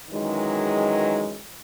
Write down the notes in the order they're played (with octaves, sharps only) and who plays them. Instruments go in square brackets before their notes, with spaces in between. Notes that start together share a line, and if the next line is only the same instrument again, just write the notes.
[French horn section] F#2 D#3 E3 F#3 G#3